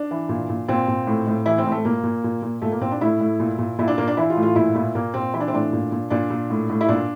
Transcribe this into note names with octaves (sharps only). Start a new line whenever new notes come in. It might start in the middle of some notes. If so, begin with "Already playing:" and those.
Already playing: D4
E3
A#2
A#2
A#2 C4
A#2
A2
A2
E3 E4
C4
A2
A3
A#2 A#3
A#2
A#2
A#2
A#2 A3
A#3
A#2 C4
D4
A2 E4
A2
A#2
A#2
A#2 E4
D4
A#2 A#3
D4
E3 E4
F4
A2
F4
A#2 E4
A#2 E4
A#2 A#3
A#2 C4
E3 E4
D4
C4
A2 D4
A#2
A#2
A#2 D4
A#2
A2
A2
E4
A#2 D4